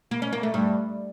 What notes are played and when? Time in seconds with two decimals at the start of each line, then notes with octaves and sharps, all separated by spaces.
0.11 A#3
0.22 C#4
0.33 A#3
0.43 A3
0.54 G2